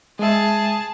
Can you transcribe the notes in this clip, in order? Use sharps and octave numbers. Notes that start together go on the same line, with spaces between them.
G#3 G#4 E5 A5